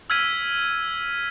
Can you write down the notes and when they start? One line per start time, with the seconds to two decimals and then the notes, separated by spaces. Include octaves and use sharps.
0.10 E6 F6 G#6 B6 D#7